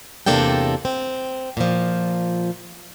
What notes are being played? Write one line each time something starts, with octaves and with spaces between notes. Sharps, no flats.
E2 C3 A#3 D4 A4 G5
C4
A#2 F3